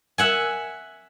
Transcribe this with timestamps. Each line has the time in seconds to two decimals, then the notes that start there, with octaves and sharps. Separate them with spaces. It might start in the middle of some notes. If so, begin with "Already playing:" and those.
0.18 E5 F#5 G#5